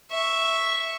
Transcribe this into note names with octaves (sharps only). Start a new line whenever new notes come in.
E5 C#6